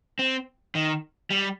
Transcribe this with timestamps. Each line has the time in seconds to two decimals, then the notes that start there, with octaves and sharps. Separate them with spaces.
0.19 C4
0.75 D#3
1.30 G3